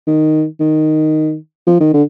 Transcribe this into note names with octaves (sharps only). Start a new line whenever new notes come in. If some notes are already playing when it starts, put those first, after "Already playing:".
D#3
D#3
F3
D#3
D3